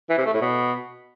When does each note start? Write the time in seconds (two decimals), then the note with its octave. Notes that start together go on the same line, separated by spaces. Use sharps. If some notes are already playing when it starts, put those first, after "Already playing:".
0.10 E3
0.18 C3
0.26 A3
0.34 A2
0.42 B2